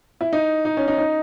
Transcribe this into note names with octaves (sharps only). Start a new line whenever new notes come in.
E4
D#4
D#4
C#4
D#4
D#4